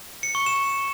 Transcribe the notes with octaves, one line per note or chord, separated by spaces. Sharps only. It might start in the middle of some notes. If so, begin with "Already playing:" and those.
C#7
C#6
E7